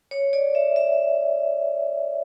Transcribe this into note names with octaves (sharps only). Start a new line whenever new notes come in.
C#5
D5
E5
E5